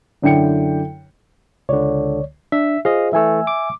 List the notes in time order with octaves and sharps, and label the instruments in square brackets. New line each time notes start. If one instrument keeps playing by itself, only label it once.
[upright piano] F#2 D3 E4 G5 C#7
[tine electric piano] C#2 D3 [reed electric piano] C#5 D5
[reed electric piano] D4 [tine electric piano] E5
[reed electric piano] F4 G#4 C5 [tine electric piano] D#5 F5
[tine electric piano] E3 A3 [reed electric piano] E5 G#5 E6
[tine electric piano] D6